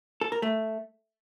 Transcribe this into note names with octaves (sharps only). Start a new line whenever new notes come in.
A4
A#4
A3